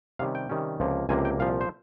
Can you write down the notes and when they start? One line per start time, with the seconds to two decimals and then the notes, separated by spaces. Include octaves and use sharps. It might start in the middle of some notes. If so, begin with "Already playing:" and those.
0.19 C3 D#3 G3 C#4 F5
0.35 G5
0.49 C3 D#3 G3 C#4
0.80 C#2 C3 F3 A#3
1.09 C#2 C3 F3 A#3 G#5
1.25 G5
1.39 C2 A#2 F3 F5
1.61 C5